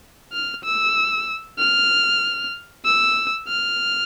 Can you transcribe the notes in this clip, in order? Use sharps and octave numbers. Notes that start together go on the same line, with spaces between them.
F6
E6
F6
E6
F6